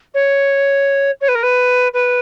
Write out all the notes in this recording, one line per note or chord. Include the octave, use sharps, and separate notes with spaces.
C#5
C#5
B4
A#4
B4
B4